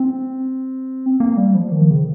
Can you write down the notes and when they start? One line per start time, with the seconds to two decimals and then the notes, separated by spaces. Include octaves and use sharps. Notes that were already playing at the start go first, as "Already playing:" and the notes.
Already playing: C4
1.20 A#3
1.37 G3
1.55 F3
1.72 D#3
1.91 C#3